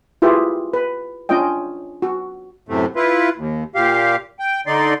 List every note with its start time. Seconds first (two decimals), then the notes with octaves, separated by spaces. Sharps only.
0.22 E4 F4 G4 G#4 B4
0.73 B4
1.29 C#4 D4 F4 D#5 G5
2.02 F#4
2.69 F#2 A2 C3 A3
2.96 E4 F4 B4
3.37 D#2
3.75 A#2 G4 F5
4.39 G5
4.67 D3 D#4 D5 C6